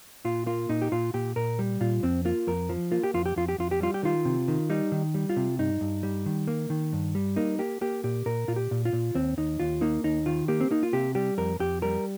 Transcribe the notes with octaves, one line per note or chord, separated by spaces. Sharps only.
A#2 F4
A#3 F4
A#2 D#4
G4
A#2 F4
A#2 G4
A#2 A#4
G3
A#2 F4
F2 C4
A#3 F4
F2 A#4
F3
A#3 F4
G4
F2 F4
G4
F2 F4
G4
F2 F4
G4
G3 F4
G4
D#3 F4
C3
D#3
G3 D#4
D#3
G3
F4
C3
G2 D#4
G2
G3
D#3
A#3
D#3
G2
G3
A#3 D#4
A#3 G4
A#3 G4
A#2 G4
A#2 A#4
A#2 F4
G4
A#2
F4
A#2
D#2 C4
D#2 D#4
D#2 F4
A#3 D#4
D#2 D#4
D#3 F4
A#3 G4
C4
A#3 D#4
F4
C3 G4
G3 G4
F2 A#4
F2 G4
G3 A#4